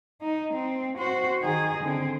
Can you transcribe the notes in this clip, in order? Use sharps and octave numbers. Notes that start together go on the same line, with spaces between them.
D#4
C4
F#4 C5
D#3 G#4
D3 C4